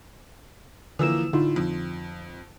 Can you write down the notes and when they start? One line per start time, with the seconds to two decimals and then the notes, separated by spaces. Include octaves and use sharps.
0.99 D3 E3 F3 A#3 E6 E7
1.33 A2 D3 D#4 F4
1.56 F2